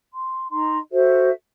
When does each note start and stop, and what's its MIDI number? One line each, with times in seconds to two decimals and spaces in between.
0.13 0.48 84
0.51 0.77 63
0.51 0.77 75
0.51 0.77 82
0.51 0.77 84
0.91 1.30 66
0.91 1.30 69
0.91 1.30 72
0.91 1.30 76